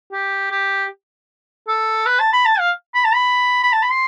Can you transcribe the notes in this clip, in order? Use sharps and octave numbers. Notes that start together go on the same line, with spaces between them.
G4
G4
A4
B4
A5
B5
A5
F5
B5
A5
B5
B5
A5
B5
C6